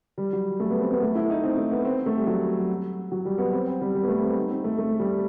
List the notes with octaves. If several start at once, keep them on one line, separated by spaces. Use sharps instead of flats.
G3
F#3
A3
B3
C4
B3
A3
E4
D#4
C4
A3
B3
C4
A3
G3
F#3
F#3
G3
B3
C4
C4
G3
G3
B3
A3
C4
D#4
C4
A3
A3
G3